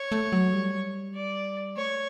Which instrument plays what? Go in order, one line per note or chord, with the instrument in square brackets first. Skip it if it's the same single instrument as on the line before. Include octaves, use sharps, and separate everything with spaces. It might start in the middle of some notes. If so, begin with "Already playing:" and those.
Already playing: [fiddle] C#5
[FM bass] A3
F#3
G3
[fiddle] D5
[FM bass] A3 [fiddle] C#5